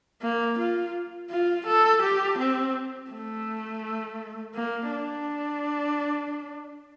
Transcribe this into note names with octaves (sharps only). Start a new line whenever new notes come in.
A#3
F4
F4
A4
G4
C4
A3
A#3
D4